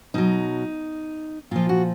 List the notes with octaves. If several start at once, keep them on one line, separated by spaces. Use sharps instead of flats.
B2 F#3 D#4
A#2 F3 F4
F#4